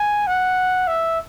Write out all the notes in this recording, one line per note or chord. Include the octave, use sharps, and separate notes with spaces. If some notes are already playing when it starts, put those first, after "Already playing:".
Already playing: G#5
F#5
E5